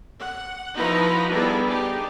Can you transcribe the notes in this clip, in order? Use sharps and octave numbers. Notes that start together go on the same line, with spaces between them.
F#5
F3 D#4 E4 F#4 B4 A#5
G3 B3 D4 E4 G#4 A4
D4 D#4 G4